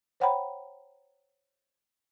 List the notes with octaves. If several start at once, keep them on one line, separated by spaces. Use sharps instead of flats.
C5 C#5 F#5 G5 A#5 B5